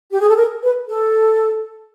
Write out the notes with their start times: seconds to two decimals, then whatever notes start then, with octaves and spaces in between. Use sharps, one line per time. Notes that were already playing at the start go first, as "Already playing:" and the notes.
0.12 G4
0.20 G#4
0.28 A4
0.36 A#4
0.63 B4
0.88 A4